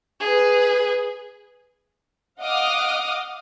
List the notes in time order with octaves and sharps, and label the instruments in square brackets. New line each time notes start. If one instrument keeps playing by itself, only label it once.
[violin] G#4 B4
[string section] D#5 F5 F#5 D6 D#6 F6